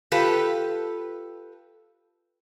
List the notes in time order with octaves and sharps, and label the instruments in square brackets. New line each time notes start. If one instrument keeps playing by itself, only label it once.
[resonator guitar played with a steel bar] F4 G4 A4 B4